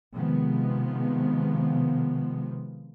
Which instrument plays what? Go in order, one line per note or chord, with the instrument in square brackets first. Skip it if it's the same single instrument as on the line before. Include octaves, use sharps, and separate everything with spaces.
[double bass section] C3 D#3 F3 G#3 B3